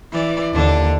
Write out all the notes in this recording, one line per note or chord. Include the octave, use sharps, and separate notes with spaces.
E3 D5
D#2 D3 D4